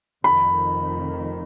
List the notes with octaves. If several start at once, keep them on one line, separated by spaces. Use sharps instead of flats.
F1 F2 D#3 B5